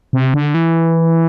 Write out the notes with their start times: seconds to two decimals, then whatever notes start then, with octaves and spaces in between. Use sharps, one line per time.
0.13 C3
0.34 D3
0.54 E3